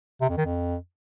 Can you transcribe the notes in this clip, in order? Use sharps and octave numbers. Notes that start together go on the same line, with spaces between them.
C3
F2
D#3
F2